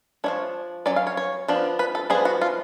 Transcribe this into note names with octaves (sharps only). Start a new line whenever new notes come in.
F3 A3 D4 C#5
F#3 C#4 D5
F5
C#5
C#5
F3 B3 D4
B4
A4
F3 B3 D4 G#4
F#4
F4